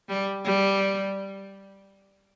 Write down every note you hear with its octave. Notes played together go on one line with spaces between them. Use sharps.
G3
G3